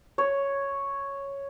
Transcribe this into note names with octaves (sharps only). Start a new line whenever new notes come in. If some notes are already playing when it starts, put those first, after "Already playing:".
C#5